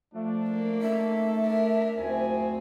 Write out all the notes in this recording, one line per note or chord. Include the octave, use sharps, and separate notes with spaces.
F3 A3 D4
A#3
C#4 D#4 A4 E5
D4 A#4
F#1 D2 C4 F4 G#5